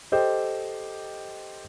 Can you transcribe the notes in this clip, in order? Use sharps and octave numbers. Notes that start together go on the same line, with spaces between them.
G4 A4 C5 D#5 G5